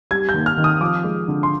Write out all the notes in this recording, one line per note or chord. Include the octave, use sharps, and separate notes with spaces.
G3 G#6
G6
D#2
F6
D#3
D#6
F3 D6
G#3
D3
C6